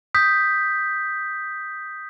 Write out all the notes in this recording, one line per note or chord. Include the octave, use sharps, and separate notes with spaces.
D#6 G6 B6